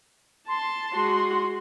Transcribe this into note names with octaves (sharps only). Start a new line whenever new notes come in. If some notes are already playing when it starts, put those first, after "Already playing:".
A5 C6
G#3 F#4